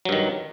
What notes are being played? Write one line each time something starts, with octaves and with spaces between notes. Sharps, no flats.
G2 D#3 F#3